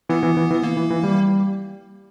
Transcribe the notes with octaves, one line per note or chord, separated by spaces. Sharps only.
E3 B3
E3
E3
E3
A#3
E3
E3
G3